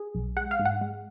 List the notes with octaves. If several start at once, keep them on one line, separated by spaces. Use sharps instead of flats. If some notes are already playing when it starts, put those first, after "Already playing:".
Already playing: G#4
B1
G#3 F#5
F5
G#2
F#5
G#3